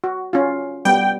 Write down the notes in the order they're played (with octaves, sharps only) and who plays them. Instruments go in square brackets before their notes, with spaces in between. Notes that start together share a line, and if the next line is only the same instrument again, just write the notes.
[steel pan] F#4
C#4 F4
[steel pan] G3 B3 [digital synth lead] G5